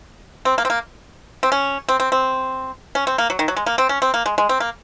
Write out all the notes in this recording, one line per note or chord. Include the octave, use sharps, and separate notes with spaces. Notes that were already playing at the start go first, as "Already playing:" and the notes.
C4
A#3
C4
A#3
C4
C#4
C4
C4
C4
C#4
C4
A#3
F#3
D#3
F#3
G#3
A#3
C4
C#4
C4
A#3
G#3
G#3
C4
A#3